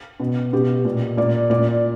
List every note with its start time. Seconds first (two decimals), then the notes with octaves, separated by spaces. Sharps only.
0.20 B2
0.53 B2 G4
0.85 A#2
1.17 A#2 D5
1.50 A#2 D5